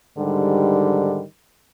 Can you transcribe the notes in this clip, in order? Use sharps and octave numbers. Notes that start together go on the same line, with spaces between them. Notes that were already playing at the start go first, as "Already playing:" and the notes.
G#2 D3 D#3 G3